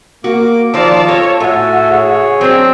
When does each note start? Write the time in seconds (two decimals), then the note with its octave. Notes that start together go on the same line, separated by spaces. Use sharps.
0.24 A#3 F#4 D6
0.74 D#3 F3 F4 C5 D5 A5 A#5 E6
1.08 A4 C#5
1.40 A2 F#4 A4 E5 G#5
1.90 G#4 C#5
2.41 F#3 C4 D4